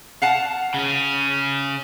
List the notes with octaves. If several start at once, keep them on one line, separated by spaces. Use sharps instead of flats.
F5 F#5 A5
C#3 C#4